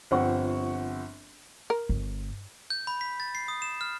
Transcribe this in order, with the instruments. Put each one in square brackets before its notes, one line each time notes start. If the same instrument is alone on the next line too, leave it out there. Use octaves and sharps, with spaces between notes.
[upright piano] G1 F3 C4 F#5 C#6
[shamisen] A#4
[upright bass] G1
[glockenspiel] G6
B5
B6
A6
C7
D#6
E7
F6